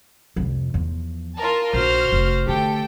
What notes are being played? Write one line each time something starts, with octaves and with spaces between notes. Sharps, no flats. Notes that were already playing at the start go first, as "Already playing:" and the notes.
C2 F2
E2 F3
F4 A#4 A5
A#1 D#4 F#4 C5 F6
F1
D3 A3 G4 A4 G5